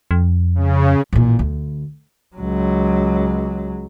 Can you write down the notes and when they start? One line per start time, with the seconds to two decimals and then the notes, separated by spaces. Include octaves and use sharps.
0.11 F2
0.55 C#3
1.13 A1 A#2
1.39 D2
2.36 C#2 F#3